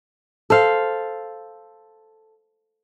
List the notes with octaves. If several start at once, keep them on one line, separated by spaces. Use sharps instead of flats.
A4 C5 F5